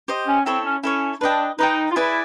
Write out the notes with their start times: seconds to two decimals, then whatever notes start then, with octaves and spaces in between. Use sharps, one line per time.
0.08 G4 C5 D#5
0.27 C#4
0.45 C4 E4 A4 C#5
0.64 C#4
0.83 C#4 E4 A4 C#5
1.21 D4 B4 D#5 G5
1.59 D#4 B4 D#5 G5
1.91 F4
1.96 E4 G#4 B4 D5